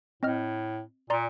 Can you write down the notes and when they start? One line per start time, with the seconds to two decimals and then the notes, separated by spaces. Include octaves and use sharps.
0.23 A2 C4 D#5 F6
1.10 A#2 D5 A#5 C6